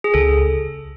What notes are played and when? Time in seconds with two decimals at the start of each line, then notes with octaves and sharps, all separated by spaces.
0.04 G#4
0.14 C#2 A4